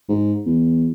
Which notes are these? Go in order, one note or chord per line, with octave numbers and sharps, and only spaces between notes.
G#2
E2